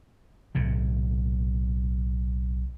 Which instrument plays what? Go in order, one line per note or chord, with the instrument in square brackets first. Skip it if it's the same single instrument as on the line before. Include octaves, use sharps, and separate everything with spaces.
[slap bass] B1 A2 C3